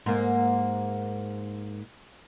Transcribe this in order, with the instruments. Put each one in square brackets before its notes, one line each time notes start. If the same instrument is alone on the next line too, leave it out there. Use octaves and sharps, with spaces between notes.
[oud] G#2 A#3